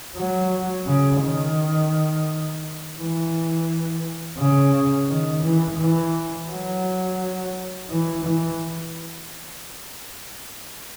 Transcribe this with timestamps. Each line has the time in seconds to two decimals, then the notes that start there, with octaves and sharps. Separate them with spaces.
0.17 F#3
0.87 C#3
1.22 D#3
2.98 E3
4.38 C#3
5.09 D#3
5.43 E3
5.79 E3
6.49 F#3
7.90 E3
8.25 E3